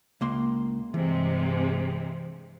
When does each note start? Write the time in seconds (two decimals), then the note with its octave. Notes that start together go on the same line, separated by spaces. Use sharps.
0.21 C#2 A#3 C6
0.94 G2 C3 E3 G#3